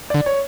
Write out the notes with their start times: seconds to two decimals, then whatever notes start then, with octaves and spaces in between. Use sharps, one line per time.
0.10 D3 D5
0.26 C#5